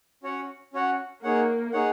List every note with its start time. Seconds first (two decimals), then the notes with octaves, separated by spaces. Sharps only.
0.23 C#4 F#4 C#5 F#5
0.73 C#4 F#4 C#5 F#5
1.23 A#3 D#4 G#4 C#5 F#5
1.72 D#4 G#4 C#5 F#5